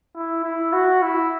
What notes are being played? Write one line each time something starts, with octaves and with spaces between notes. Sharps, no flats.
E4
E4
F#4
E4